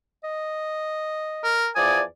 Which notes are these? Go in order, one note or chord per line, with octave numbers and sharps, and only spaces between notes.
D#5
A#4
E2 F3 D5 G#5 D#6